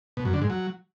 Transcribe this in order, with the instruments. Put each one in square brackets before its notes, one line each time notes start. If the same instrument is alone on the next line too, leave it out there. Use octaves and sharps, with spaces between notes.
[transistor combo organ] B2
F#2
D3
G#2
F#3